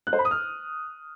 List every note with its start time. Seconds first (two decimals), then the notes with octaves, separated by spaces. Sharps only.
0.07 F#6
0.13 C5
0.19 B5
0.25 D#6
0.31 F6